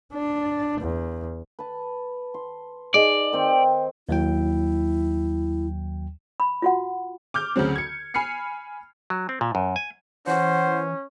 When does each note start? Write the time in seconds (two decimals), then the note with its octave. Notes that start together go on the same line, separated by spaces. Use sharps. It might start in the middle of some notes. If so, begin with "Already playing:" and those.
0.13 D4
0.81 E2
1.59 B4 A5
2.34 C6
2.94 D#4 G#4 D5 D#5
3.33 D#3 C4 G5
4.09 D#2 F#3 E4 G5
6.40 B5
6.62 F4 F#4 F#5
7.34 D6 F6 G6
7.56 D2 C#3 F#3 C4
7.76 G#6 C#7
8.14 G#5 B5 F6 C7 C#7
9.10 F#3
9.29 C4
9.41 A#2
9.55 F#2
9.76 G#5
10.27 E3 C#4 C5 F#5